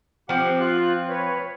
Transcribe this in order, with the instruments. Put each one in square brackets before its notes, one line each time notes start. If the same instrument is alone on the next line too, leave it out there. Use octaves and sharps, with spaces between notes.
[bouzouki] F3 C4 [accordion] G4 F#5
[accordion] F4 F#6
B4 C#5